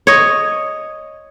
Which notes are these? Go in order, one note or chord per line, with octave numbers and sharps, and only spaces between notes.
C#5 D#5